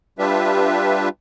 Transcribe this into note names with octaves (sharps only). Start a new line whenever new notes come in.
G3 D4 F4 G4 B4 E5